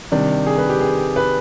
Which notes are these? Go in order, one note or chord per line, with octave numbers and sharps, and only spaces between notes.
C3 D#3 G3 D4
G#4
B4
G4
G#4
B4